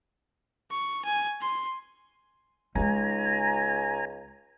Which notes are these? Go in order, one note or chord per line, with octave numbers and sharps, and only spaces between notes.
C#6
G#5
C6
C#2 G#3 D#4 G#5 A#5